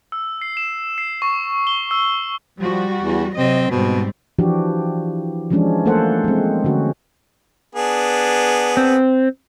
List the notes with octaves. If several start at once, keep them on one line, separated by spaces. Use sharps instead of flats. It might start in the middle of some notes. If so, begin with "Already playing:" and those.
E6
C7
E7
C7
C#6
G7
E6
F3 G3 F#4
E2
C3 F#3 C4 D#5
G#2 B2 G3 C4
E3 F3 D4 F#4 G4
E3 F3 G#3 C#4 D4
A3 A#3 A4 C5 F#5
G#3 C4
D3 C#4 F#4
B3 D4 G#4
C4